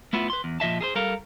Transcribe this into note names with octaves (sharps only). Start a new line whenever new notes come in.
A3 B3 E4 F4
B4 C6
E2
A#2 F3 D#5 E5 A5
G#4 A4 C5
G3 A4 A#4 F5